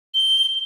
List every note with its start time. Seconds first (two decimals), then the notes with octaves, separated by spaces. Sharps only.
0.14 G7